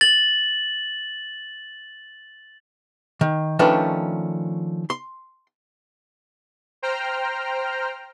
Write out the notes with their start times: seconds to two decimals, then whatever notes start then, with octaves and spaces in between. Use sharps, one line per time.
0.01 A6 F#7
3.21 D#3
3.59 D#3 F3 A3 C#4 D4 B4
4.90 C6
6.82 C5 G5 A#5 F6